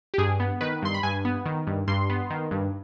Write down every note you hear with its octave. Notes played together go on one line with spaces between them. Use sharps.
G4
G2 G#4
B3
D#3 B4
G2 C6
B5
G2 G#5
B3
D#3
G2
G2 C6
B3
D#3
G2